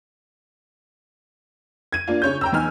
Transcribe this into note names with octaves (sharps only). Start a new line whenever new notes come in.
G#6 D#7
A#3 D4 F4
C#3 C#5 G6
G5 A#5 E6
E2 D#4 G#5 F6